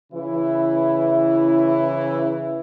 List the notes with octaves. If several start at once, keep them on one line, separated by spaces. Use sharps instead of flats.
C#3 E3 E4